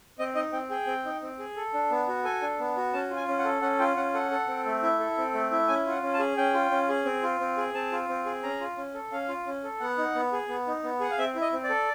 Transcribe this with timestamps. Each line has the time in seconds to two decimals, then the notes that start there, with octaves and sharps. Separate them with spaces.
0.19 C4 D#5
0.35 D#4 D#5
0.52 C4 G5
0.70 G#4 G5
0.87 C4
1.05 D#4
1.22 C4
1.39 G#4
1.56 A4
1.74 D4
1.91 B3
2.08 F#4
2.24 A4 G#5
2.42 D4
2.60 B3
2.77 F#4
2.93 C#4 A5
3.10 F4
3.17 G#5
3.28 C#4
3.39 F#5
3.45 A4
3.62 C#4 F#5
3.79 F4 G5
3.96 C#4 F#5
4.14 A4 F#5
4.31 A4
4.48 C4
4.66 A3
4.83 E4
5.00 A4
5.17 C4
5.34 A3
5.51 E4
5.68 C#4 G#5
5.86 F4 F#5
6.03 C#4
6.14 A5
6.19 G#4
6.37 C#4 G5
6.54 F4
6.71 C#4
6.89 G#4
7.05 C4
7.23 F4
7.40 C4
7.57 G#4
7.74 C4 A5
7.92 F4
8.09 C4
8.25 G#4
8.43 C#4 A#5
8.61 F4
8.77 C#4
8.94 A4
9.12 C#4 F5
9.29 F4
9.47 C#4
9.64 A4
9.80 B3 F#5
9.98 D#4
10.15 B3
10.33 G#4
10.49 B3
10.67 D#4
10.84 B3
11.00 G#4 F#5
11.10 F5
11.18 C4 E5
11.35 E4
11.42 D#5
11.52 C4
11.64 D5
11.70 A4